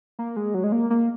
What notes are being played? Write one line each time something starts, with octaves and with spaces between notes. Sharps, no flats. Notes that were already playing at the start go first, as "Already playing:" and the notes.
A#3
G#3
F#3
G#3
A#3
A#3